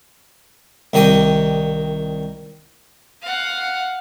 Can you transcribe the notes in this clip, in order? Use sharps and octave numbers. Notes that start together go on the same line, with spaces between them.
C2 D#3 G4 D#5
F5 F#5